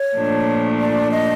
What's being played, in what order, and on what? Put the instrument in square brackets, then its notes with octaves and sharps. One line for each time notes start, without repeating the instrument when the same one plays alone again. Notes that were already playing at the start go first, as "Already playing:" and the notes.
Already playing: [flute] C#5
[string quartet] A#2 F3 A3 D4
[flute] D5
D#5